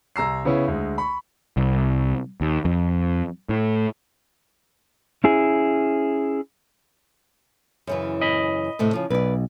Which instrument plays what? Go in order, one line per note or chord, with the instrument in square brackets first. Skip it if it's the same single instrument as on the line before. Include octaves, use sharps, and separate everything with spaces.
[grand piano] C2 A#5 E6 C7
C#3 B3 C#4 E4
D2 G#3
B5 C#6
[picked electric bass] C2
D#2
F2
A2
[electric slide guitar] C#4 E4 G#4
[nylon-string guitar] F#2 C#3 E3
[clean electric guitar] D#5 B5
[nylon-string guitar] A2 C3 A3
C#3 F3
[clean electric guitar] B1 [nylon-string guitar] B4 D5